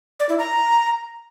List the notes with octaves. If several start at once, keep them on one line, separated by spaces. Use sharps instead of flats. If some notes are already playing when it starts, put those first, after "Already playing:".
D5
E4
A#5